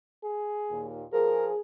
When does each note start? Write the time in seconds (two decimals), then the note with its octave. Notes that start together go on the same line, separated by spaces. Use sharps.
0.23 G#4
0.70 D#2 A#2
1.12 F3 G#4 A#4